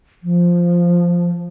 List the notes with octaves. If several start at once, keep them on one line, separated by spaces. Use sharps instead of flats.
F3